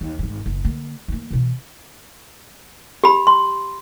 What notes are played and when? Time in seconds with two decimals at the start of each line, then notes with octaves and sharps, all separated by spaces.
0.01 D#2
0.19 D#1 G#1
0.46 F#1
0.65 D3 A#3
1.08 E3 A#3
1.31 B2 E3
3.04 G4 B5
3.27 C6